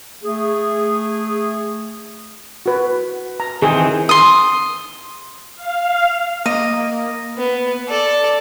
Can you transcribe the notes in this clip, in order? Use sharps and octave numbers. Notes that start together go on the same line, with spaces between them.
A3 G#4
F#4 B4
A#5
D#3 E3 C4 G#4
C6 D#6
F5
A#3 D#5
B3
A4 D5